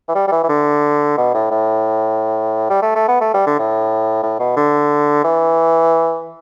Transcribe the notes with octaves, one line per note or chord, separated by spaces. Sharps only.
E3
G3
G3
E3
E3
D3
B2
A2
A2
G3
A3
A3
B3
A3
G3
D3
A2
A2
B2
D3
E3